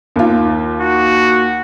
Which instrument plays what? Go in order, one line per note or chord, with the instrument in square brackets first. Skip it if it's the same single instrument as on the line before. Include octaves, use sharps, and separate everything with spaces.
[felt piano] D#2 F4
[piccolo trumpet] F#4